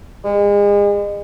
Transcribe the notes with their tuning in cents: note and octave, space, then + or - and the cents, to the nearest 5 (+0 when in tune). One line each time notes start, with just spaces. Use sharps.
G#3 -35